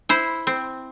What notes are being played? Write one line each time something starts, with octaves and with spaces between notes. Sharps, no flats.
E4 C5
C4